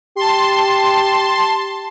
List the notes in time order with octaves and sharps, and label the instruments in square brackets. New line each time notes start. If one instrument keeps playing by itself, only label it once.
[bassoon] G4 [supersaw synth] A5 C6